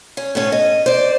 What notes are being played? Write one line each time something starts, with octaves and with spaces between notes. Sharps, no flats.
C#4
A2 B3 C#4 A4
D#5
C5 D5